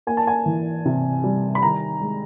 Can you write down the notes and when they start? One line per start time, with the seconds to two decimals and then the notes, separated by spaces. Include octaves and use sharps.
0.07 A#3 G#5
0.17 A5
0.27 G#5
0.46 E3
0.86 C3
1.24 G3
1.55 B5
1.63 D#3 A#5
2.01 G#3